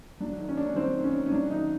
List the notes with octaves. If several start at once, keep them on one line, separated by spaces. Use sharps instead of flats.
F#3 D4
D#3
C#4
D#3 D4
C#4
F#3 C4
D#3
C#4
D#3
C#4
F#3 D4
D#3 D#4